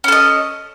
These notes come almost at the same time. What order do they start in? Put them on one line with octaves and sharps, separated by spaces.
C#4 A4 D#5